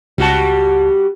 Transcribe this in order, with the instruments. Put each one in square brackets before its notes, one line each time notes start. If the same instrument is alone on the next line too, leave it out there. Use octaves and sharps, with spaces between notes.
[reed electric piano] C#2 A5 [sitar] G3 F#4